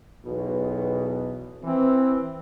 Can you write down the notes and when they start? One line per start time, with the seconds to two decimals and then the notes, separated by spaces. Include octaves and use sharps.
0.25 B1 E2 B2
1.63 E3 C4